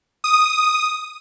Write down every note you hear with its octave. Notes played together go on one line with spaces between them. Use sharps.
D#6